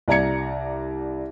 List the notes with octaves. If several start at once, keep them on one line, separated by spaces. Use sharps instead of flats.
C2 D5 A#5 G#6 C#7